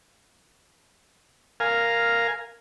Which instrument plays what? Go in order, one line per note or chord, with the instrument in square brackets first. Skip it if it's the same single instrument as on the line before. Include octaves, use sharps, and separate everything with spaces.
[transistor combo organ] A#4 F5 G#5